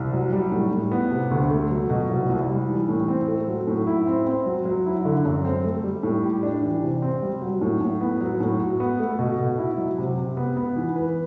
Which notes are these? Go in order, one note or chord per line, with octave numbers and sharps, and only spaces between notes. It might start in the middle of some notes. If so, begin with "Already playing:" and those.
Already playing: C2
F#3
G3
A2
A2
B3
C3
D2
A3
F#3
B2
C2
C2
G3
E3
A2
C4
A3
F#3
A2
E4
C4
C4
F#3
F#3
E4
D3
F#2
C4
A3
G3
A2
G4
D4
E3
C3
C4
G3
F#3
A2
A2
B3
F#3
A2
F#4
B3
A3
B2
B2
E4
F#3
C3
C3
B3
B3
E3
B4